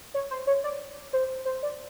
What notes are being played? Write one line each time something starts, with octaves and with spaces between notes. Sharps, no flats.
C#5
C5
C#5
D5
C5
C5
D5